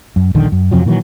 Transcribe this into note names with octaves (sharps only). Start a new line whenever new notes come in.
F#2
D#1 A#1 D3 D#3
F#2
F2 C3 F3 F#3
A#2 D#3 E3 F#3